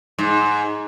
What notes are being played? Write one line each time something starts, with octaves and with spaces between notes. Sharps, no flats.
G#2